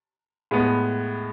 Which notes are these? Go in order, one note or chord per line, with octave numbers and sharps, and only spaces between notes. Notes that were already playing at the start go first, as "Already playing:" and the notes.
A2 G#3 B3